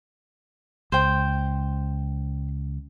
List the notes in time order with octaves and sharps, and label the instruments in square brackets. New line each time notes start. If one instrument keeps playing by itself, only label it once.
[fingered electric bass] C#2 [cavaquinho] C5 G5